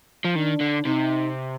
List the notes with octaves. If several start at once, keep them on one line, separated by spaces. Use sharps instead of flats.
F3
D#3 D4
D3
C3 D#4